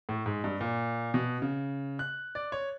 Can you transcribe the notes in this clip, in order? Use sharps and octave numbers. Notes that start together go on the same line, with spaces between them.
A2
G#2
G2
A#2
B2
C#3
F#6
D5
C#5